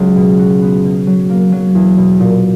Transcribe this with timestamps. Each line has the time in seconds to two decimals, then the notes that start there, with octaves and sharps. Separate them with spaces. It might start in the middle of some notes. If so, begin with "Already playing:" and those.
Already playing: C#2 F#3
0.16 B2
0.39 F#4
0.62 B3
0.84 B2
1.07 F#3
1.30 A#3
1.52 F#3
1.75 E2
1.98 B2
2.20 A#2